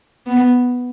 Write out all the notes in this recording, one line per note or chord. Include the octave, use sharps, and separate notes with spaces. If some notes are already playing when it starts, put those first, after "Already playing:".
B3